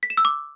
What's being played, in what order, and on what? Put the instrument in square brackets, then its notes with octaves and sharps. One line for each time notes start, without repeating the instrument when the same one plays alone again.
[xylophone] B6
E7
E6
D6